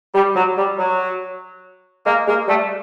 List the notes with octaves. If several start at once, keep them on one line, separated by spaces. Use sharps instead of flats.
G3
F#3
G3
F#3
G#3 A#3
G#3 A#3
G3 A3